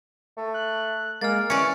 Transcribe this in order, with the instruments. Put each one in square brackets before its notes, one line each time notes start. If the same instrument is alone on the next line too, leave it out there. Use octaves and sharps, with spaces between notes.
[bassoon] A3
[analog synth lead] F#6
[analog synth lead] G#3 [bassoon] A#3 [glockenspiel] F6 A6
[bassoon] E3 [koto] C#4 D5 [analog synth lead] C#6 [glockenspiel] C#7